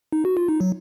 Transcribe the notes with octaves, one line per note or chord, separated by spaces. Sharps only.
D#4
F#4
F4
D#4
F#3